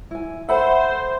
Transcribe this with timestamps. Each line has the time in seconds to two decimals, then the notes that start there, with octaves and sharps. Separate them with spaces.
0.11 E4 G#5
0.49 A4 C5 E5 F#5 B5